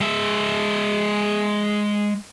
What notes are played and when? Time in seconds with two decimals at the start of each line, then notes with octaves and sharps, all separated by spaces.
0.01 G#3 E5